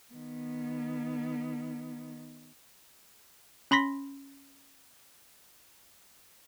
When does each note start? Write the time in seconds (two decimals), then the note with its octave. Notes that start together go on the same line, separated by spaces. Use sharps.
0.12 D#3 B3
3.71 C#4 B5 C6 A#6 B6